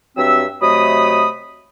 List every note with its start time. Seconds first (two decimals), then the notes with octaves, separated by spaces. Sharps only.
0.17 G2 F#3 C4 E5 E6
0.62 C3 F#3 A3 D#5 B5 D#6